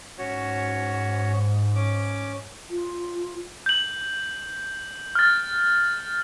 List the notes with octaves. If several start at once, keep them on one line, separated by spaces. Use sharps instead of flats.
G#2 C#4 F#4 C#5
C#4 D6
F4
G6 F#7
F6 A6